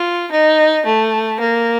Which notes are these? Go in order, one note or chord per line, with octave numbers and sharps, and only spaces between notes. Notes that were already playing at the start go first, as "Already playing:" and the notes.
Already playing: F4
D#4
A3
A#3